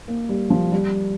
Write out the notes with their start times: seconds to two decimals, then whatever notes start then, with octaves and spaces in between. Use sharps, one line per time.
0.08 A#3
0.29 G3
0.50 F3
0.72 G3